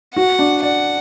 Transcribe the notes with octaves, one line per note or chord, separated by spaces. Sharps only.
F#4 F#5
D4
D5 F#5